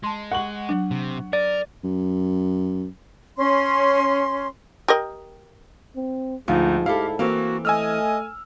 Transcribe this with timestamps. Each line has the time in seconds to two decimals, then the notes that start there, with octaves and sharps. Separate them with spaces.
0.04 G#3 A5 C6
0.32 F#5 C#6 F#7
0.69 F#3 D4
0.91 C3
1.33 A#4 D5
1.84 F#2
3.37 C#4 C6
4.88 G4 A#4 D#5
5.96 C4
6.48 D2 G#2 F3 D#4
6.86 E4 G4 A4 F5
7.19 E3 A#3 C4 F#4 F5
7.65 A3 D#5 G#5 E6 F6